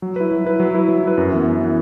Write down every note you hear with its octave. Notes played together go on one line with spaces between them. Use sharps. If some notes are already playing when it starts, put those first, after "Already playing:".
F#3
E4 B4
F#3
E4 B4
F#3
E4 B4
F#3
E4 B4
F#2
E3 B3
F#2
E3 B3